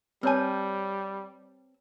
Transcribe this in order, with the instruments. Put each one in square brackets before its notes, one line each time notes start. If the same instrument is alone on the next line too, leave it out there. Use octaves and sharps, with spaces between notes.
[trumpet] G3 [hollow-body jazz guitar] C4 G#5 [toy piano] B4 C#5 A5